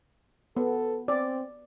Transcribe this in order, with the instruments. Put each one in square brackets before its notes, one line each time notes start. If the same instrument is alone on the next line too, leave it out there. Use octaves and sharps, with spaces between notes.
[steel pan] B3 [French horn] A4
[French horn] C4 [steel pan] D5